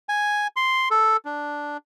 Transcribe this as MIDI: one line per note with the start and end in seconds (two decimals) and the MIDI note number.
0.09 0.47 80
0.56 0.89 84
0.91 1.17 69
1.25 1.77 62